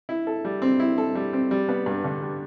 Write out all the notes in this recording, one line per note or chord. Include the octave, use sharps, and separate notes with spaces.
E4
A4
G3
C4
E4
A4
G3
C4
G3
B3
G2
D3
G3